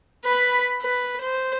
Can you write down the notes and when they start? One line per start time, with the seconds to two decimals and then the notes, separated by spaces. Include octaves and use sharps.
0.25 B4 B5
0.81 B4
1.22 C5